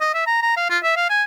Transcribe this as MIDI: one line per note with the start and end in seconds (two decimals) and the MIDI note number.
0.01 0.11 75
0.14 0.23 76
0.27 0.39 82
0.42 0.56 82
0.57 0.69 77
0.70 0.78 65
0.83 0.93 76
0.96 1.07 77
1.09 1.23 80